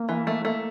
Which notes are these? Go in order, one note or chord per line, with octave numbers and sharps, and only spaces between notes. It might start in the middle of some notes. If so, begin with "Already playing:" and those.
Already playing: A#3
E3
A3
A3